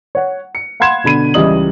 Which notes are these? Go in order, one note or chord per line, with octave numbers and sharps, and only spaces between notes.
C#5 F#5
C#7
F5 F#5 B5 C6 G#6 E7
B2 D3 B5 D#7
C#2 E3 G3 D#5 D#6 F#7